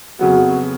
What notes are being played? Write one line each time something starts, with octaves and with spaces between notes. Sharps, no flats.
F2 C#3 F#3 B3 F#4